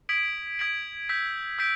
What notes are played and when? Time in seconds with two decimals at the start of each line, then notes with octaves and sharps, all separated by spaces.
0.09 D#6 G#6 B6 D7 F#7
0.59 D#6 G#6 B6 D7 F#7
1.08 E6 G6 B6 D7
1.59 E6 G6 B6 D7